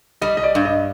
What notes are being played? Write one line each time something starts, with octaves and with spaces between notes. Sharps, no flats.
G3 D#5
D#5
D5
G2
D#5